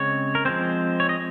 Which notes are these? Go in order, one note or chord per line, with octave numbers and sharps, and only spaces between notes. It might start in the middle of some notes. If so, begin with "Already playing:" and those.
Already playing: C#3 G#3 C4 C#5
A#4
F3 G#3 C4 C5
C#5
D#5